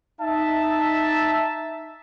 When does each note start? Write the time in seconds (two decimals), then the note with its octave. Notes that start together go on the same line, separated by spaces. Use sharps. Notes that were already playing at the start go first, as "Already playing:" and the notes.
0.21 D#4 E5 A5